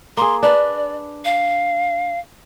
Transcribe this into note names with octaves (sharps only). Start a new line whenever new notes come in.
A#3 G#4 C6
D4 B4 D5
F5